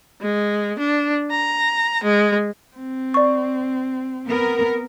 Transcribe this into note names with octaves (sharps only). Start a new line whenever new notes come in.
G#3
D4
A#5
G#3
C4
D5 C#6
B3 A#4